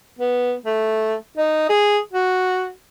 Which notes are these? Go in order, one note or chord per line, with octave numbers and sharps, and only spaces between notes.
B3
A3
D#4
G#4
F#4